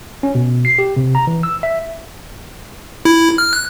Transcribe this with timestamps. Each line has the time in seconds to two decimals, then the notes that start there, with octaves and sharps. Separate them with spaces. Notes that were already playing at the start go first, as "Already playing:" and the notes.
0.23 C#4
0.35 B2
0.65 C7
0.78 G4
0.97 C3
1.15 A#5
1.27 E3
1.43 E6
1.63 E5
3.05 E4
3.38 F6
3.53 F#6